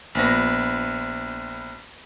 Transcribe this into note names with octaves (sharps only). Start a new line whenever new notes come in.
A#1 B3 A#6